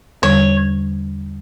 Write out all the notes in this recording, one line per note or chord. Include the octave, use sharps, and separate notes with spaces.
E2 D3 G3 C#5